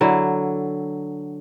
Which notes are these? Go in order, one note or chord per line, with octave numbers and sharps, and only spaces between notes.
D3 F#3 E4